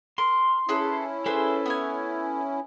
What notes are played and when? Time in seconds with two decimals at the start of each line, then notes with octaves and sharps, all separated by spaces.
0.18 A#4 C6
0.69 C#4 E4 G#4 A4 B4
1.26 G#4 A4 B4 C5
1.66 B3 C#5 G#5